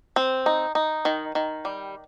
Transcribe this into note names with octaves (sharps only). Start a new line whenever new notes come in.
C4
D#4
D#4
D#3
D#3
G3